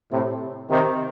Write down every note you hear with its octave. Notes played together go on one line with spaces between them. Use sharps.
A2 C3
C3 D#3